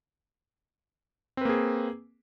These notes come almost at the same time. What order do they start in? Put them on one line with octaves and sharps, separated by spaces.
C4 B4 A#3 G#4